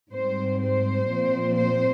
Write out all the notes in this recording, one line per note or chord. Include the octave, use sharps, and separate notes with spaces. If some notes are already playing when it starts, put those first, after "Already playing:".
G#2 G3 C4 C5
C5
A#2 F3 C4
C5